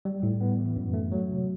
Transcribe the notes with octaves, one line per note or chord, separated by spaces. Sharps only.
G3
A2
B3
E3
F#2
A3
F#3
C3